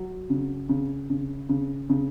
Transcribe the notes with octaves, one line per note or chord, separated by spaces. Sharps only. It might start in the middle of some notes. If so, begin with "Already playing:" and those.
Already playing: F#3
C#3
C#3
C#3
C#3
C#3